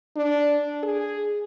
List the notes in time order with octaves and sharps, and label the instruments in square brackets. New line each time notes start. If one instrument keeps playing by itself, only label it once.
[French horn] D4
G#4